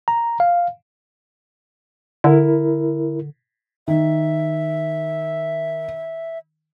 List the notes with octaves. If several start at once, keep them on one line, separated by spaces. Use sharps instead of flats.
A#5
F5
D3 E4 A#4
D#3 E5